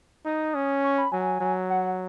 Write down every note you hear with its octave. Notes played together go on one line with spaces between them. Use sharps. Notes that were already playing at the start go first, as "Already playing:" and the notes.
D#4 D#6
C#4
C#6
B5
F#3 G#5
F#3
F#5